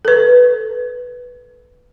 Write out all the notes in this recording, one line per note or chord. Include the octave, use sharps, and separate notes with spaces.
A4 B4